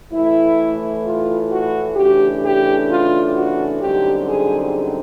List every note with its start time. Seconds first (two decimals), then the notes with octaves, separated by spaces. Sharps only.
0.12 A2 E3 A3 E4
1.04 F4
1.51 F#4
1.96 C#3 E3 A3 D4 G4
2.43 G4
2.89 F4
3.34 F#4
3.81 F#2 D3 G3 C4 D#4 G4
4.27 G#4